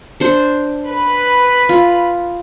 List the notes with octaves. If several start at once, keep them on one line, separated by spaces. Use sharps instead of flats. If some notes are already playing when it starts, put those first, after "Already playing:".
D4 C5
B4
F4